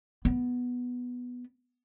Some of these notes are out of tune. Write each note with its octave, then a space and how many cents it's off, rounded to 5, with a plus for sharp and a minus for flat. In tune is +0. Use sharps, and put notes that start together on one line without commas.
B3 +0